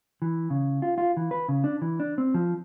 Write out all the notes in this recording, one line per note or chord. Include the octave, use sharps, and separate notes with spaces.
E3
C#3
F4
F4
E3
B4
C#3
D4
E3
D4
C4
F3